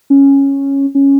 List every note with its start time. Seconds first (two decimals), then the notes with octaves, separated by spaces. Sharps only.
0.10 C#4
0.95 C#4